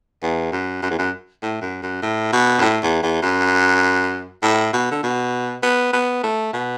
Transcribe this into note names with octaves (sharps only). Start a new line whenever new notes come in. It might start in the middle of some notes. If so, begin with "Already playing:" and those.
E2
F#2
F#2
E2
F#2
A2
F#2
F#2
A2
B2
F#2
A2
E2
E2
F#2
A2
B2
D3
B2
B3
B3
A3
B2